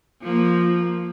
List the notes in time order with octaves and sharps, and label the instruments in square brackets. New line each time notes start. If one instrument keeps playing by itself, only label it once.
[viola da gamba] F3 A#3